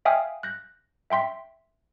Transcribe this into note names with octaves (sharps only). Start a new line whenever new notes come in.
E5 F5 G5 G#5 D#6 F6
F#6 G6 A#6
E5 G5 C6 B6